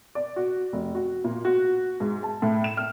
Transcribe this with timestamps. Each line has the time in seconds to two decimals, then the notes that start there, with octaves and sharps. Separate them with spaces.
0.15 D5
0.36 F#4
0.73 F1
0.95 F#4
1.24 A#2
1.45 F#4
2.00 G#2
2.23 A5
2.42 A2
2.64 E7
2.77 F6